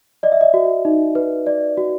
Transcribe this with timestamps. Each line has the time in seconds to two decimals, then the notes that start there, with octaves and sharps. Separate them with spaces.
0.23 D5 D#5
0.32 E5
0.41 D#5
0.54 F#4
0.85 D#4
1.15 B4
1.47 D5
1.77 F#4